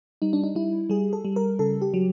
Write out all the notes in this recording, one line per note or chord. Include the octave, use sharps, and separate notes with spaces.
G3 D#4
D4
D#4
G3 E4
G3 G#4
A4
G3
A#4
C#3 A4
G4
F#3